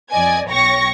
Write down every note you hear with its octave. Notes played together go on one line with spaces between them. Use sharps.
F2 D5 D#5 G#5 G#6
B1 C#5 G5 C#6 A#6